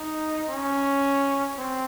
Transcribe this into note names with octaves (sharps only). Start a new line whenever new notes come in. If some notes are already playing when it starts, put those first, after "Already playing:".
Already playing: D#4
C#4
C4